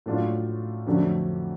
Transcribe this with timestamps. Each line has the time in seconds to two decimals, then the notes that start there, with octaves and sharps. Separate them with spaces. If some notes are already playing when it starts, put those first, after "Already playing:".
0.06 A2 F#3 A3 D4 F4
0.86 F2 D3 F#3 A3 D4